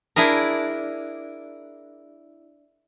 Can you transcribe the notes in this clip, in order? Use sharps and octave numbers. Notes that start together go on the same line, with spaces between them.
D4 E4 G#4 A#4